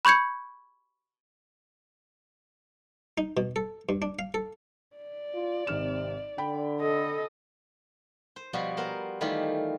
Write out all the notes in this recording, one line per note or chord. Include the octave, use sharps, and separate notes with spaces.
B5 C#6 G6 G#6 C#7
D#4
B2
A4
G2
D4
F5
A4
D5
F4
G#1 C3 F6 E7
D3 G5 B5
A4 D#5
C5
B2 F3 G3 B3 F4 F#4
B3 A#4 C5
D#3 E3 G3 A3 F4 G4